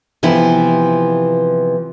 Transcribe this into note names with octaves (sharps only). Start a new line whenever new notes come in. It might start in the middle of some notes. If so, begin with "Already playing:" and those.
C3 E3 F3 B3 E4